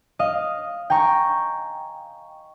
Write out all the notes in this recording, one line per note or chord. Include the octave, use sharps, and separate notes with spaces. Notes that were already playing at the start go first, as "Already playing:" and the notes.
D#5 F5
G5 G#5 A#5 C#6